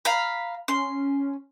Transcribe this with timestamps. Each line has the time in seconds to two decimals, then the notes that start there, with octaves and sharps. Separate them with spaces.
0.05 F5 A#5 B5
0.68 C#4 C6